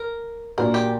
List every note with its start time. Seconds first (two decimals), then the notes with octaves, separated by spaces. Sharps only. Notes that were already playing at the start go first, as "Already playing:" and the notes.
Already playing: A#4
0.58 A#2 A#3 D4 F#4 A#4
0.74 G4